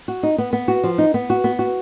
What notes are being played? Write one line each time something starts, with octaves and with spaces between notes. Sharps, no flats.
F#4
D#4
B3
B3
F#4
F3
D#4
B3
F#4
B3
F#4